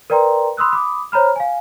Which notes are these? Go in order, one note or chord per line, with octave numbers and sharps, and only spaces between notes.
A#4 B4 D5 G5 A#5 C6
B5 C6 D#6 E6 F#6
B5 D6 D#6
C5 C#5 A#5 B5 F6
F5 G#5